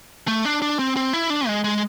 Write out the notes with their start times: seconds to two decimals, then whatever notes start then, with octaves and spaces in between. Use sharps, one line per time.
0.28 A3
0.45 D4
0.62 D4
0.79 C4
0.96 C4
1.13 E4
1.30 D4
1.47 G#3
1.64 G#3